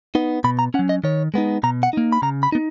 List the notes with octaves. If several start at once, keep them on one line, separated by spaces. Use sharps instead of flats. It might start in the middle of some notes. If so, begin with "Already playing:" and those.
B3 D#4
B2 B5
A#5
C#4 F#5
F#3
D#5
D#3 C#5
G#3 B3 D#4
B2 A#5
F#5
A#3 D#4
B5
C#3 A#5
B5
B3 D#4